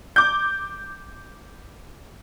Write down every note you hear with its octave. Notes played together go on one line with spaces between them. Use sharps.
D6 G6